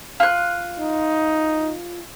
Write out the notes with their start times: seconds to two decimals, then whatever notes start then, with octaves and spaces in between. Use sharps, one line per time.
0.20 F4 F#6
0.79 D#4